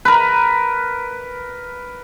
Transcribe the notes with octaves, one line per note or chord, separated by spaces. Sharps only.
A#4 B4